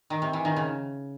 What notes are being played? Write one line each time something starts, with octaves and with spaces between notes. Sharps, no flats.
D#3
C3
E3
D#3
C#3